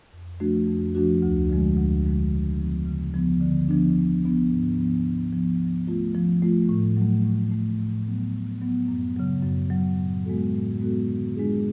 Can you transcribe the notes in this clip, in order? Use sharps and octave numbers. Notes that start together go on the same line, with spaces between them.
F2
F3 A3 D4 F#4
F2
F3 A3 D4 F#4
D2
D3 F3 G#3
D2
D3 F3 G#3
C#3
F3 B3
C#3
F3 B3
D3
F3 B3 D4
D3
F3 B3 D4
G#2
F3 B3
G#2
F3 B3
F3
A3 F4
F3
A3 F4
A2
F#3 A3
A2
F#3 A3
A2
F#3 B3
A2
F#3 B3
F#2
C#3 F#3
F#2
C#3 F#3
A2
G#3 B3 F#4 A4
A2
G#3 B3 F#4 A4
D3
G#3 D4 F4 G#4